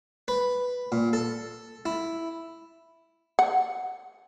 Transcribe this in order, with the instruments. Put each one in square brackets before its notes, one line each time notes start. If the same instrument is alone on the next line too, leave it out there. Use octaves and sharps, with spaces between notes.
[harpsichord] B4
A#2
A4
E4
[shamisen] F#5